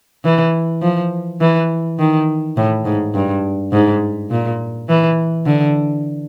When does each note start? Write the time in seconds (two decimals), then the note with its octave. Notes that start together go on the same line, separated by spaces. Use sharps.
0.25 E3
0.82 F3
1.41 E3
1.99 D#3
2.57 A2
2.85 G#2
3.14 G2
3.73 G#2
4.31 A#2
4.89 E3
5.46 D3